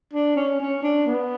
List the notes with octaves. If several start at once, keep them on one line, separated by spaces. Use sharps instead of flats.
D4
C#4
C#4
D4
B3